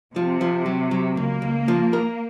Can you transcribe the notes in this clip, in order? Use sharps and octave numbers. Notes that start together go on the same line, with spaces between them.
C3 F3
F3
F#3
F#3
C#2 A#3
C#2
F3
A#4